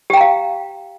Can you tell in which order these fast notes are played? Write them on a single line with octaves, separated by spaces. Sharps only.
G4 G5 A#5 F5